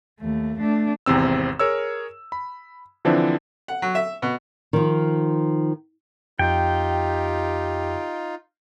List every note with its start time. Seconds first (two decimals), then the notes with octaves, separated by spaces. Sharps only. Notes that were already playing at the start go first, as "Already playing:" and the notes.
0.20 D#2 A3
0.59 A3 D4
1.06 G#1 E2 C3 C4 E6
1.59 G#4 A#4 C#5 E6
2.32 B5
3.05 D3 E3 F3 C4 D4 E4
3.68 F#5
3.82 F#3
3.95 E5
4.22 B2
4.73 D#3 F3
6.39 F2 D#4 F4 G4 G5